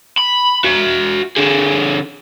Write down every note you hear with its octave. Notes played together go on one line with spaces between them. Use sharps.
B5
F#4 E5
D3 G#4